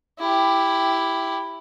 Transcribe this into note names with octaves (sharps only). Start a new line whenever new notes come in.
E4 G4